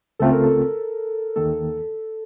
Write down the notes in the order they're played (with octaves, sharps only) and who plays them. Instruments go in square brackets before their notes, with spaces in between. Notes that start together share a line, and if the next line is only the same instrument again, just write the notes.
[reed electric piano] C#2 C#3 A3 C4 F4 [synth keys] A4
[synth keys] A#4
A4
[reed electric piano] D#2 D#3 A#3 [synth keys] A4